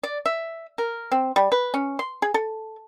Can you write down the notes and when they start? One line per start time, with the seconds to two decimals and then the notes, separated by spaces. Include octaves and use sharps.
0.03 D5
0.26 E5
0.78 A#4
1.12 C4
1.36 G3
1.52 B4
1.74 C#4
1.99 C6
2.22 G#4
2.34 A4